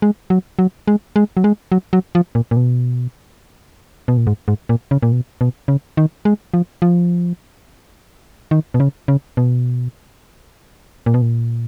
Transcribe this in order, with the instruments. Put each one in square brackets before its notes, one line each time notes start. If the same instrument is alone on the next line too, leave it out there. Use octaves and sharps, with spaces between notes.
[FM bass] G#3
F#3
F#3
G#3
G#3
F#3
G#3
F#3
F#3
F3
A#2
A#2
B2
B2
A#2
G#2
G#2
A#2
C#3
A#2
B2
B2
C#3
D#3
G#3
F3
F3
D#3
B2
C#3
C#3
B2
A#2
B2
A#2